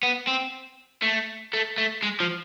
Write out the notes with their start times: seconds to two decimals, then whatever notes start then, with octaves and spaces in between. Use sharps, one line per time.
0.03 B3
0.27 C4
1.02 A3
1.53 A3
1.78 A3
2.02 G#3
2.20 F3